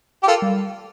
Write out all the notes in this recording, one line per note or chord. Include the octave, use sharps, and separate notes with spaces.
G4
F4 A4 A#4
G3